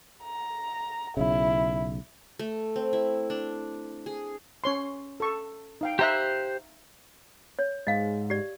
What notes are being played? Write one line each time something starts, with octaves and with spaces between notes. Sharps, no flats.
A#5
B1 C#3 E4
A3
C4
E4
D4
G#4
C#4 C#5 C6
A4 C#6
D#4 F5 G5
G4 C5 E5 A#5 C6 F#6
C#5
G#2 D#5 F5
G4 D5